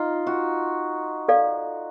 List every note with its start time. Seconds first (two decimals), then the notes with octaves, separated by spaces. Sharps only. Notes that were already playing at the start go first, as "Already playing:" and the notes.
Already playing: D#4 F4
0.27 F#4
1.28 A4 D5 F5